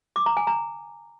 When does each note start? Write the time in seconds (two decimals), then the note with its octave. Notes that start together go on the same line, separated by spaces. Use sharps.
0.16 D6
0.26 A#5
0.37 G#5
0.47 A#5